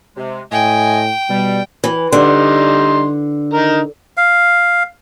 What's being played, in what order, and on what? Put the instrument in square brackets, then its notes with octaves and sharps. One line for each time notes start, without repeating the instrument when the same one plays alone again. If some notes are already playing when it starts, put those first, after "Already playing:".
[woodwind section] C3 G#3
[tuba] A2 [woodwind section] A3 D#5 G#5 [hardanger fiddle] G5
[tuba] B2 [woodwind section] G3
[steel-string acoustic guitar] E3
[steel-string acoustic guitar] D3 [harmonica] G3 D#4 C6
[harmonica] D#4 A#4
[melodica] F5